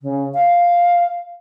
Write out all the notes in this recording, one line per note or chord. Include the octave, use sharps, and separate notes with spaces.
C#3
F5